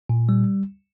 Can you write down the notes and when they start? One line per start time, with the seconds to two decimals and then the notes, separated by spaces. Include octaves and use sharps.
0.10 A#2
0.29 G3